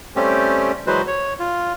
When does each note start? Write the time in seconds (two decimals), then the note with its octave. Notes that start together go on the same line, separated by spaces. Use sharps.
0.16 G3 A3 C4 C#4 G4
0.87 E3 F#3 G#3 F#4 B4 C5
1.07 C#5
1.40 F4